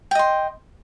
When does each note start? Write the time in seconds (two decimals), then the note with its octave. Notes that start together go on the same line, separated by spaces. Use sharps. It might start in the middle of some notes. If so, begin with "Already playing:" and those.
0.11 G5
0.15 D#5
0.19 C6